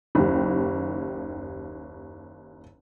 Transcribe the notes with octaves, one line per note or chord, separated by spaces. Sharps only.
F#1 D#2 G4